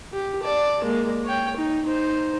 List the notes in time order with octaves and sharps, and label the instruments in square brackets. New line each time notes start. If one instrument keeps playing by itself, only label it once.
[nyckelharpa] G4
D5 A5
G#3 A#3
C#5 G5
D#4
D#4 C5